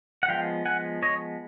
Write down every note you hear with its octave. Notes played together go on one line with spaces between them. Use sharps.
F#5
F3 G#3 B3 F5 G5
F#5 G#5
C#5 D#5